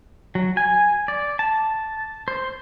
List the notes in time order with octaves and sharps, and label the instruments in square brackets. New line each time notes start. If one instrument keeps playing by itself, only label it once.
[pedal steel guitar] F#3
G#5
D5
A5
C5